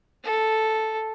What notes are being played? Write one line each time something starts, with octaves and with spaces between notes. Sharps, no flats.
A4